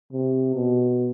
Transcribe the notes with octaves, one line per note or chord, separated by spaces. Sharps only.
C3
B2